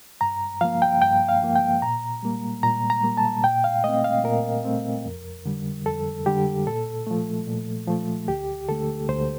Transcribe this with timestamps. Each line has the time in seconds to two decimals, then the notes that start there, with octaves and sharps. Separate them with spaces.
0.21 G2 A#5
0.61 F3 A#3 F5
0.82 G5
1.02 G2 G5
1.29 F5
1.42 F3 A#3
1.56 G5
1.82 A#2 A#5
2.23 G3 A#3
2.63 A#2 A#5
2.90 A#5
3.04 G3 A#3
3.17 A5
3.43 A#2 G5
3.64 F5
3.84 A3 C4 D#5
4.04 F5
4.24 A#2 A#4
4.65 A3 C4
5.05 F2
5.45 D3 G3
5.86 F2 A4
6.26 D3 G3 G4
6.66 A#2 A4
7.07 F3 A3
7.47 A#2
7.87 F3 A3
8.28 D2 G4
8.68 D3 A3 A4
9.09 D2 C5